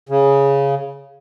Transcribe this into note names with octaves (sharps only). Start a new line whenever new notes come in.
C#3